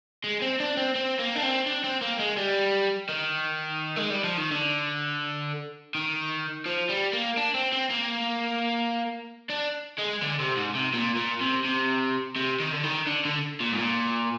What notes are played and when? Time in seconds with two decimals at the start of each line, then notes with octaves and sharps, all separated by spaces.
0.24 G#3
0.42 C4
0.60 D4
0.77 C4
0.95 C4
1.19 A#3
1.35 D4
1.43 C4
1.66 D4
1.84 C4
2.02 A#3
2.20 G#3
2.37 G3
3.09 D#3
3.96 G#3
4.10 G3
4.24 F3
4.38 D#3
4.52 D3
5.95 D#3
6.66 F3
6.89 G3
7.13 A#3
7.37 D4
7.55 C4
7.72 C4
7.90 A#3
9.50 D4
9.98 G#3
10.22 D3
10.40 C3
10.57 G#2
10.75 C3
10.94 A#2
11.17 A#2
11.41 C3
11.65 C3
12.36 C3
12.60 D#3
12.72 D3
12.84 D#3
13.07 D3
13.25 D3
13.60 A#2
13.72 G#2
13.78 A#2